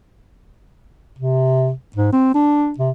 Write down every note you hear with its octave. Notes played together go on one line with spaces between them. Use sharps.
C3
G#2
C4
D4
C3